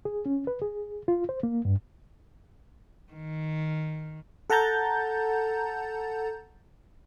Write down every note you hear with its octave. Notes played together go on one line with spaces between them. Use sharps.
G#4
C#4
B4
G#4
F4
C5
A#3
G2
D#3
A4 F#5 A5 A#5 G6 A6